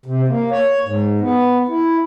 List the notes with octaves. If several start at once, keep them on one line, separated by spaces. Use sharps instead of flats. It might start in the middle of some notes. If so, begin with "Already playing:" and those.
C3
A#3
C#5
G#2
B3
E4